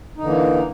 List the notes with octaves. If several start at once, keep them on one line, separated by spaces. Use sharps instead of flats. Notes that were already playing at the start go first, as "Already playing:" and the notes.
D3 E3 A#3 D#4